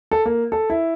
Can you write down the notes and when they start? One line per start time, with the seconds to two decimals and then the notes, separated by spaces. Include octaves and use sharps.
0.11 A4
0.26 A#3
0.52 A4
0.70 E4